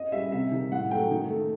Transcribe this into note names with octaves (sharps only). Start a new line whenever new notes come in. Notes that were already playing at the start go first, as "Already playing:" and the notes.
Already playing: D#5
G3 E5
C3 E5
D#3 G3
A2 F#5
F#3 A3 G5
D#3
A3